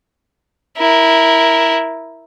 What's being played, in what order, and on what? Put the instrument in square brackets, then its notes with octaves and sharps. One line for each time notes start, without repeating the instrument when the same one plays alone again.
[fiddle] E4 A#4